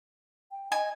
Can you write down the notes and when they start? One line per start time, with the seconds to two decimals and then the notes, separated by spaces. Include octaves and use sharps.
0.51 G5
0.72 D#5 G#5